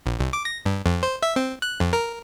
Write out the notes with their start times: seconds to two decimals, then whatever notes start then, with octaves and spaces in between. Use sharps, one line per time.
0.06 A#1
0.19 C2
0.33 D6
0.45 A#6
0.65 G2
0.86 F2
1.03 C5
1.23 E5
1.36 C4
1.62 F#6
1.80 F2
1.93 A#4